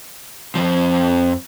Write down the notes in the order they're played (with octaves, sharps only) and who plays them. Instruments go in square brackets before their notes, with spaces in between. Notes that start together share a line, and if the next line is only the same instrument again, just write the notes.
[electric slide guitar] F2 A#2 F3 [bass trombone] C4